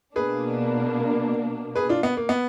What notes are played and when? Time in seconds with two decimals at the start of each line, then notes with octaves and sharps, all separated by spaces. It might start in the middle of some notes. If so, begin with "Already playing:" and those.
0.15 B2 A#3 D4 G#4 B4
1.76 G#4 B4
1.89 D4 F4
2.03 B3
2.17 A#3
2.29 B3